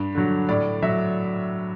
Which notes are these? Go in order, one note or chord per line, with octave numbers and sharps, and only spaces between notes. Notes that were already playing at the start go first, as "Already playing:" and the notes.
Already playing: G2
D3 F#3
A2 D5
F#3 E5